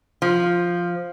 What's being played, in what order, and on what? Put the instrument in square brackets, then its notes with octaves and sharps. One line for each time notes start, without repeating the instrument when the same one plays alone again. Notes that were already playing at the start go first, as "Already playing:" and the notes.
[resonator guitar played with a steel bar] F3